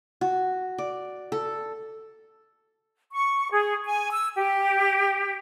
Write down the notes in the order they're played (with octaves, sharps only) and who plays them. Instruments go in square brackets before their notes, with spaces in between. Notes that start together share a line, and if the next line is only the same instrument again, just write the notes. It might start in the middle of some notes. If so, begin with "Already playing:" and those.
[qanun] F#4
D5
A4
[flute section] C#6
G#4
G#5
E6
G4